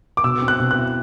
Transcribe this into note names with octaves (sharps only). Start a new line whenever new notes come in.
D6
B2 E6
C4
F#6
B2
F#6
E4